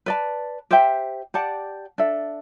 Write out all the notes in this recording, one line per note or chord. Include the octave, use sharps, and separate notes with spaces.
B4 D5 A5
G4 C5 E5 G5
G4 D5 F#5 A5
D4 A4 E5